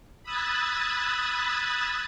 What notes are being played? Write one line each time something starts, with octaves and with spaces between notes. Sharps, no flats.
B5 D#6 E6 F#6 G#6 A6